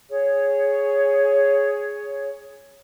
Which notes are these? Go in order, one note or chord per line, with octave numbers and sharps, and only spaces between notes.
G#4 C#5